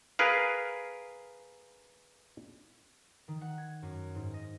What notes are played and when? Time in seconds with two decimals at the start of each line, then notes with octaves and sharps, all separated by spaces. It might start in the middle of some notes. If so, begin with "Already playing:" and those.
0.19 G#4 A#4 B4 F5
3.28 D#3
3.41 F#5
3.58 G#6
3.82 F#2
4.15 G#2
4.34 D#5